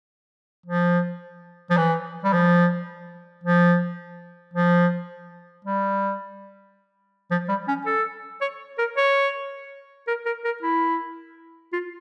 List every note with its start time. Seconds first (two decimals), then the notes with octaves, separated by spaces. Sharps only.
0.66 F3
1.70 F3
1.77 E3
2.24 G3
2.33 F3
3.44 F3
4.54 F3
5.65 G3
7.31 F3
7.48 G3
7.68 C#4
7.86 A4
8.41 C#5
8.78 A#4
8.97 C#5
10.07 A#4
10.26 A#4
10.45 A#4
10.62 E4
11.73 F4